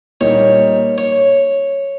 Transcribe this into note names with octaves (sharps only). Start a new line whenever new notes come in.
A#2 G3 A#3 D#4 C#5
C#5